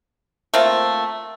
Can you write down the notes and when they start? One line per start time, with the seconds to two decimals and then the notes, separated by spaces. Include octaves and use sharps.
0.54 A3 A#3 C4 F4